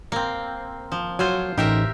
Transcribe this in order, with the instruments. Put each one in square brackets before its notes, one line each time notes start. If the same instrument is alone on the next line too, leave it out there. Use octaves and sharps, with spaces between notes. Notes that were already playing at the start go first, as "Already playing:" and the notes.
[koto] A#3 C4
F3
[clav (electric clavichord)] F#3 F#4 F5 [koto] F4 C5 G#5
[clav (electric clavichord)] A1 D#4 [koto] G4 A#4 E5